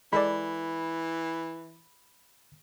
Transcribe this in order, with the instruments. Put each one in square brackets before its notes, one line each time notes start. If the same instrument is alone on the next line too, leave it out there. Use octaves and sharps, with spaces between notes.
[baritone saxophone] E3 [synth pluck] G#3 A4 D5 [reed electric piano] B5